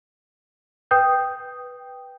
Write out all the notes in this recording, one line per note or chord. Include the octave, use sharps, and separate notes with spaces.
B4 G5 D#6 G6